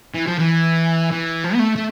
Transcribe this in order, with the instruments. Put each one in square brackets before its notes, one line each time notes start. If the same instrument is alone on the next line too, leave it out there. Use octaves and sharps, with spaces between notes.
[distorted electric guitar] E3
F3
E3
E3
F3
B3
A3
A3